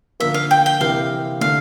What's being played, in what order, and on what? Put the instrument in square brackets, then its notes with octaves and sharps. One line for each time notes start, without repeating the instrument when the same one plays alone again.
[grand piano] D3 F3 A#3 [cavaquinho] E5
[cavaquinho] F5
G5
G5
[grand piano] C3 E3 A#3 [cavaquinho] F5
[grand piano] D3 A3 [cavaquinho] F5